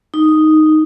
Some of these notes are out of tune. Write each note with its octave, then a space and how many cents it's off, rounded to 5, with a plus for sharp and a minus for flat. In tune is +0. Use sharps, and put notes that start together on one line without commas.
D#4 +0